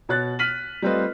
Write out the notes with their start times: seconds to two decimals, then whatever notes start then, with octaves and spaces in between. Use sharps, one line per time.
0.09 B2 C#5 F#6 A6
0.39 F6 B6 D#7 F#7
0.82 G3 A3 C4 F4 B4 D#5